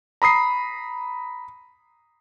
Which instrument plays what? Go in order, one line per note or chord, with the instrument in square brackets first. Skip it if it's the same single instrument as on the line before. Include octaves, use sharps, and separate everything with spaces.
[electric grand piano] A#5 B5 D#6 C7